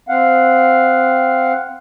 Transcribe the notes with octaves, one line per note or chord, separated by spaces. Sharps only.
C4 F5 F#5